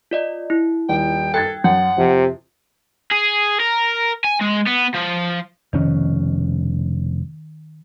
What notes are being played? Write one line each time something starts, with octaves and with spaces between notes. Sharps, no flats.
F4 D5 D#5
E4
D#1 G5
A4 G5 F#6 G#6 A6
F#2 F#5 G6
F2 C3
G#4
A#4
G#5
G#3
B3
F3
F1 B2 D#3 C#4